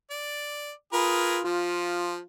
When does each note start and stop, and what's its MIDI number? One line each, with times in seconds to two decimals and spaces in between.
0.10 0.71 74
0.93 1.44 65
0.93 1.38 68
0.93 1.38 70
0.93 1.38 71
1.44 2.17 53
1.44 2.25 65